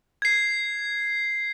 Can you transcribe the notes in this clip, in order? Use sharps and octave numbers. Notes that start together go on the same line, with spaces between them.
G#6 C7